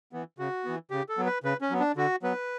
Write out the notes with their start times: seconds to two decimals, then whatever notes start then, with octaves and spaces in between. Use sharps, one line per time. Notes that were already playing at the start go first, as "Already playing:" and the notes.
0.12 E3 B3
0.39 C#3 F#4
0.65 E3 B3
0.91 C#3 G4
1.09 A4
1.18 F#3 B3
1.26 B4
1.44 C#3 B4
1.61 C#4
1.70 F#3 B3
1.80 D4
1.96 D3 F#4
2.23 F#3 B3 B4